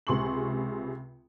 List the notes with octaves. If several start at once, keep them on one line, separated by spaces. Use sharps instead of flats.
C#2 C3 G#4 C6 C#6 F#7